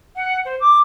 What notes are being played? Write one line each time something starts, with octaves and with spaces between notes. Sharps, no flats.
F#5
C5
D6